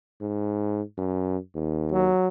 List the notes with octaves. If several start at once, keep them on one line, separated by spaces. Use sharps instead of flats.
G#2
F#2
D#2
F#3